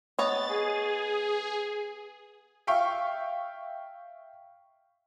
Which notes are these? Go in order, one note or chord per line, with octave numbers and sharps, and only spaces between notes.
B3 C#5 D#5 A6
G#4
E5 F5 G5 C#6